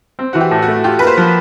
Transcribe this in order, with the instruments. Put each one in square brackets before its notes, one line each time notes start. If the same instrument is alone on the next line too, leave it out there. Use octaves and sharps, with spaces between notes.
[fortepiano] C4
[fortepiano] E3 [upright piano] F#4
[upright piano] G4
[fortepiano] A2
[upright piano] F#4
[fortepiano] A3
[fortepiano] F4 [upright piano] G4
[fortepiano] A#3 [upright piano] B4
[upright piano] C5
[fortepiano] F3